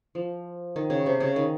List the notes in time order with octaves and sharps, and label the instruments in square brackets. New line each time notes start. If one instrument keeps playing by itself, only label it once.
[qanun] F3
D#3
C#3
C3
C#3
D#3